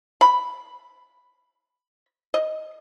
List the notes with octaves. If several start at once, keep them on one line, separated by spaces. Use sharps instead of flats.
B5
D#5